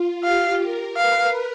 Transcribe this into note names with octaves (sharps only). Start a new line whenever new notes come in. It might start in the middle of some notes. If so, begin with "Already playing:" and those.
Already playing: F4
G4 F5
A#4
B4 F5